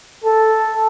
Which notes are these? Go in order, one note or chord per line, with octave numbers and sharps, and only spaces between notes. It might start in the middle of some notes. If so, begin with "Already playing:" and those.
A4